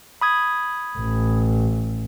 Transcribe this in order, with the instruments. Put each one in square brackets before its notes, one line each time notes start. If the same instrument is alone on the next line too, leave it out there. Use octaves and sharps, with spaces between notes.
[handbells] B5 D#6 G#6
[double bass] A1